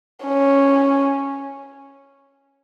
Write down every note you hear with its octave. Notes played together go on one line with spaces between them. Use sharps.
C#4